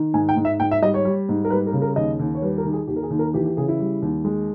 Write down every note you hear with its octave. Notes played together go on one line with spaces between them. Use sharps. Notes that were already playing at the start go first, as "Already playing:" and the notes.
Already playing: D#3
G#2 G#5
G5
G#2
E5
G#2 G5
E5
G3 D#5
C#5
G3
G#2
A#4
G3 B4
A#4
C#3
A#4
D#2 D#5
D#2
C#5
G3 B4
A#4
D#3
G#4
D#2 G4
A#4
G#4
D#2
A#4
E3 G4
G4
C#3 G#4
E4
G3
D#2
G#3